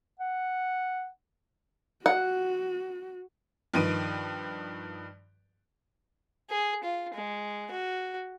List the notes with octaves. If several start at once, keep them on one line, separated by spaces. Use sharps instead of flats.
F#5
F#4 F#5
G2 D#3 F3 B4 D7 D#7
G#4
F4
G#3
F#4